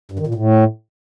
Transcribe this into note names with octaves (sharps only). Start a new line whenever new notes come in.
G2
D#3
A#2
A2